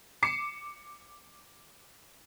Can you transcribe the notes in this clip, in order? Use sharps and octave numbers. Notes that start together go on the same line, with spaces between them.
D6 C7 C#7 E7